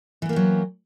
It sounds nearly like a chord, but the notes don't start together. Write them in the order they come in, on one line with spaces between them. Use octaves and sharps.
E3 B3 A#3 G4 F#3